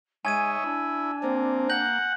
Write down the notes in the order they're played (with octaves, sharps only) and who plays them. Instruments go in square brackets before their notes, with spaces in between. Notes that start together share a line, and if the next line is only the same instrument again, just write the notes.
[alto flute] G#3 [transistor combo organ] D#4 C#5 E5 [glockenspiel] G#5 G#6 D#7
[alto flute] D4 [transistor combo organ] E4
[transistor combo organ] A#3 [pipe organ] C4
[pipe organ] F#5 [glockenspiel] G6 A#6 F#7